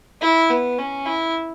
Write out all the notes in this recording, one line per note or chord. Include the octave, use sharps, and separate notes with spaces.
E4
B3
C#4
E4